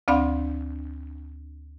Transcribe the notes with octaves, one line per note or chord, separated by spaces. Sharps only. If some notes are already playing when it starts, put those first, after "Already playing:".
D2 C4 D4 D5 F5 B5